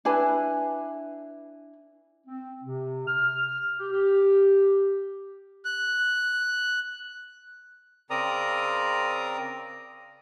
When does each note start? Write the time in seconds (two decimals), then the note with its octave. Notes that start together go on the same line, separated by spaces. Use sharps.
0.05 D4 E4 B4 G#5
2.27 C4
2.63 C3
3.07 F6
3.78 G4
3.91 G4
5.65 F#6
8.10 C#3 C4 A#4 D5 A#5 D#6